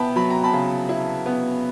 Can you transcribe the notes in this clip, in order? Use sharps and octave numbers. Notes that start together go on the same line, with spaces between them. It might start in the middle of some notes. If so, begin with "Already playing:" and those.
Already playing: B3 E4 G5 A5 B5
F#3 B5
A#5
A5 B5
C#3
E4
B3